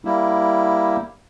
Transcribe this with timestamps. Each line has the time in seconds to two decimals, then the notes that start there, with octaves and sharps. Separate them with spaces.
0.05 G3 A#3 E4